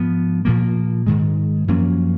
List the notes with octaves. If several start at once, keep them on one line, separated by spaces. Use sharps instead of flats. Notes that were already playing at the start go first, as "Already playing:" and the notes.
Already playing: G#2 F3 B3
A#2 F3 A#3
G#2 D#3 G#3
F#2 F3 A#3 C#4